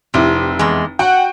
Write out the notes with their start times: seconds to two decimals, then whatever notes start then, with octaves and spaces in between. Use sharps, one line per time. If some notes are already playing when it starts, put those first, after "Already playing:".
0.14 F1 C3 E4
0.59 E2 G#3
0.99 F#4 F#5 G5